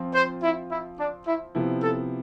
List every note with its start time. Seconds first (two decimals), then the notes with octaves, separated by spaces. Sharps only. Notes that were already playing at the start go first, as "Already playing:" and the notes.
Already playing: F3 C4 F4
0.14 C5
0.42 E4
0.71 E4
0.99 D4
1.26 E4
1.55 C3 F3 B3 E4
1.82 A4